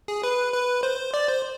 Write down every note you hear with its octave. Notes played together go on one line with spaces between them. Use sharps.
G#4
B4
B4
C5
D5
C5